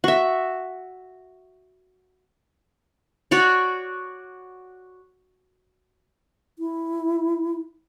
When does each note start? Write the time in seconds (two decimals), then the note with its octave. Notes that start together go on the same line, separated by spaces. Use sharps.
0.04 F#4 E5
3.31 F#4 C#5 D5
6.59 E4